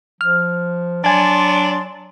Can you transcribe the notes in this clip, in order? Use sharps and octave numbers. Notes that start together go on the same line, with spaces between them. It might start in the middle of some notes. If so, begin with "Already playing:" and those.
F3 F6
F#3 D4 D5 G#5 A5 C6